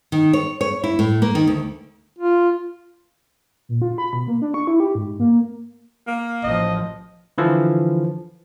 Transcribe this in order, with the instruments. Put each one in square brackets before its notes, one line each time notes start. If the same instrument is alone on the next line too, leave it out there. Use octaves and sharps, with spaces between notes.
[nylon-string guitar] D#3
C#5
C#5
E4
A2
A#3
D#3
D2
[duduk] F4
[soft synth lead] A#2
F4
B5
B2
A#3
D4
C#6
E4
G4
G#2
A#3
[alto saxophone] A#3
[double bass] A1 F3 [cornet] D#5
[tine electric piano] D3 E3 F3